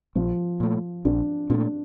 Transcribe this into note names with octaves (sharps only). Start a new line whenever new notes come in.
A#1 F3
A#2 A3
A#1 D4
A#2 A3 D4